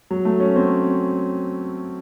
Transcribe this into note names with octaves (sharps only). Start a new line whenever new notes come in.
F#3
A3
C#4
C4